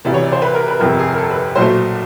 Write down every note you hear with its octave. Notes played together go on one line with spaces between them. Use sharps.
D2 C3 E3 D5
C#5
D5
C5
B4
A#4
B4
G1 F2 C3 A#4
G#4
A#4
A4
B4
B1 A#2 F#3 A3 C5